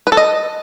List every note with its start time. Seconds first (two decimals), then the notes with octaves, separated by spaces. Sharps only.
0.07 B4
0.12 A4
0.17 D#5